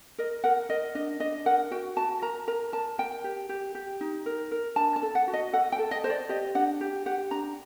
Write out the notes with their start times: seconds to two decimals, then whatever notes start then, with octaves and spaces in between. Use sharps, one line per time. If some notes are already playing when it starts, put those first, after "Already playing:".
0.18 A#4 D#5
0.44 A#4 F#5
0.69 A#4 D#5
0.95 D4 D#5
1.20 D4 D#5
1.46 A#4 F#5
1.71 F#4 G5
1.96 F#4 A5
2.22 A#4 A#5
2.48 A#4 A#5
2.73 A#4 A5
2.98 A#4 G5
3.24 G4
3.49 G4
3.75 G4
4.01 D#4
4.26 A#4
4.51 A#4
4.76 D4 A5
4.96 A5
5.02 A4
5.15 F#5
5.28 F#4
5.34 D#5
5.53 A4 F#5
5.72 G5
5.79 A4
5.91 D#5
6.04 A4 C5
6.10 D5
6.29 G4 D#5
6.55 D4 F#5
6.81 G4
7.06 G4 F#5
7.31 D4 A#5